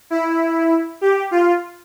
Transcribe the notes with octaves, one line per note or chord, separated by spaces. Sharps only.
E4
G4
F4